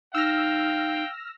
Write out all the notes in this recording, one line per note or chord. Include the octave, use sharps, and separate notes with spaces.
D#4 F5 G5 E6 F6 A#6